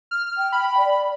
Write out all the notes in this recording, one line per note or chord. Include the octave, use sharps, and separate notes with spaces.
F6
G5
B5
D5